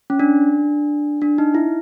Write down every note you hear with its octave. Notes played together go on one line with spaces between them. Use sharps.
C#4
D4
D4
D#4
E4